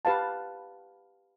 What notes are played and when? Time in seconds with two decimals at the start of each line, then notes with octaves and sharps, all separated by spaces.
0.05 G4 B4 F5 A5